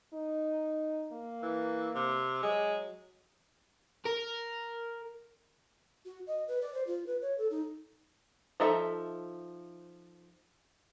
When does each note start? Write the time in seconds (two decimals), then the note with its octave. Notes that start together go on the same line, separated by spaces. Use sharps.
0.13 D#4
1.12 A#3
1.43 E3
1.95 C3
2.43 F#3 G#3
4.05 A#4
6.05 F#4
6.27 D#5
6.48 B4
6.62 D5
6.74 C5
6.87 F4
7.07 B4
7.21 C#5
7.38 A4
7.51 D#4
8.60 F3 D#4 A4 E5